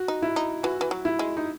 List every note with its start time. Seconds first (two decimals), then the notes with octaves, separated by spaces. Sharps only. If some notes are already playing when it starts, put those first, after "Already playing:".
Already playing: F#4
0.08 D#4
0.22 E4
0.36 D#4
0.63 E3 F#4
0.81 E3
0.91 F#3
1.05 E4
1.19 G#3
1.37 D#4